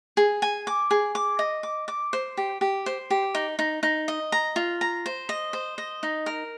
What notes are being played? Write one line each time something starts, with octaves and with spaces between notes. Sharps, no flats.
G#4
G#5
D6
G#4
D6
D#5
D6
D6
C5
G4
G4
C5
G4
D#4
D#4
D#4
D#5
A#5
F4
A#5
C5
D#5
C5
D#5
D#4
A#4